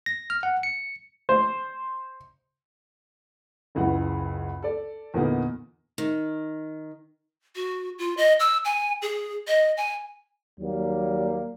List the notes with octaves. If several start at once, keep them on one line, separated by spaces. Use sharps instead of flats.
A#6
F6
F#5
C#7
C5
F#1 C#2 E3 F#5
A4 D5
E2 A#2 D3 A#3 B3 D#4
D#3
F#4
F4
D#5
E6
G#5
G#4
D#5
G#5
D#2 F#3 G3 A#3